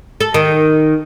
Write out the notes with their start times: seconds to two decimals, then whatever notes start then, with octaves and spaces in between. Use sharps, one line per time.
0.21 A4
0.34 D#3